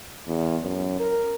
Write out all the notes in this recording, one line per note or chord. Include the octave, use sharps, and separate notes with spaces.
E2
F#2
A#4